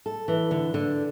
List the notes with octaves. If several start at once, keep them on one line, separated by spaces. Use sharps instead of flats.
A4
E3
D3
D3